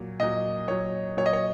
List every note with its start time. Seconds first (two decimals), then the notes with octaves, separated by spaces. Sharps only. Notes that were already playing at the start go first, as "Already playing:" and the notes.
Already playing: A#2 F#3
0.20 A#2 F#3 D#5
0.68 A#2 F#3 C#5
1.17 A#2 F#3 C#5
1.26 D#5
1.33 C#5